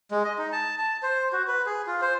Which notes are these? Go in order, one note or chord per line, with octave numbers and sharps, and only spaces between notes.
G#3
D#5
D#4
A5
A5
C5
F#4
B4
G#4
F4
C5